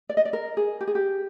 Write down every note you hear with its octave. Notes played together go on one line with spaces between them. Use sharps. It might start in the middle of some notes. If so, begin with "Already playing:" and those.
D5
D#5
D5
A#4
G#4
G4
G#4
G4